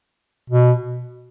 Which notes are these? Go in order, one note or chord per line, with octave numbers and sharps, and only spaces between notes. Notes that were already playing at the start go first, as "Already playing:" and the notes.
B2